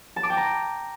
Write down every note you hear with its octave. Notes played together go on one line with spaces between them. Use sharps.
A5
D6
G5
A#5